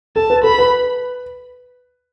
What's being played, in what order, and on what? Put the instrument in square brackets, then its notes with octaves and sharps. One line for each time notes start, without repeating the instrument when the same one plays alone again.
[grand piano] A4 [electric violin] A5
[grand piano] B4
[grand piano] A4 [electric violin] B5
[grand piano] B4